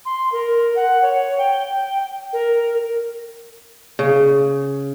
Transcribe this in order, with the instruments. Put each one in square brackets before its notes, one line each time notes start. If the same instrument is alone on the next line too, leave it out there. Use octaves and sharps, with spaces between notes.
[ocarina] C6
A#4
F#5
C#5
G5
A#4
[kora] C#3